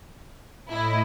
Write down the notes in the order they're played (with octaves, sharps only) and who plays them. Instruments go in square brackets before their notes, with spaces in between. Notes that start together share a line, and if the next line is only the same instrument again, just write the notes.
[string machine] A2 D#5 [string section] E4